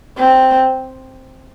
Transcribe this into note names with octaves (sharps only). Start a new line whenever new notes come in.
C4